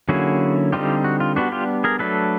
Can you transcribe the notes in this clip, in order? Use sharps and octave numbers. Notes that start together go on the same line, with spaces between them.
D3 F#3 A#3 C#4 E4 F#4 G#4
D3 G3 C4 D#4 F4 G4
F#4
F4
G3 B3 D4 F#4
F4 G4
G#4 A#4
F#3 A3 D4 A4 B4